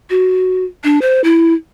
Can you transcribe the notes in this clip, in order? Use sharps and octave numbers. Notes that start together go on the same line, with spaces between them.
F#4
D4
C5
E4